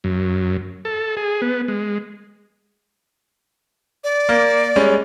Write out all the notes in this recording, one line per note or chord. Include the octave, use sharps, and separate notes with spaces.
F#2
A4
G#4
B3
G#3
D5
A#3
G3 G#3 C#4